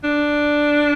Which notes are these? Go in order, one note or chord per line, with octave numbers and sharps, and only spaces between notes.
D4